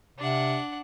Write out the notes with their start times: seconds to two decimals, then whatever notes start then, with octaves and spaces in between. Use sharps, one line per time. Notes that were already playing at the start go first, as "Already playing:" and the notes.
0.18 C3 D4 F#5